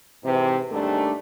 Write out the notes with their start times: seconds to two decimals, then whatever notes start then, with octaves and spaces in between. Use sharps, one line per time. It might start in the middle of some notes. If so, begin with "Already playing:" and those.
0.23 G#2 C3 E3
0.70 D#2 G#2 G3 A3 D4